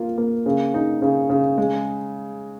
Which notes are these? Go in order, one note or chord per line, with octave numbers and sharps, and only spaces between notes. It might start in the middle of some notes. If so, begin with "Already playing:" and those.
Already playing: A#3 F4
A#3
C#3
D#4
C#3
C#3
G#3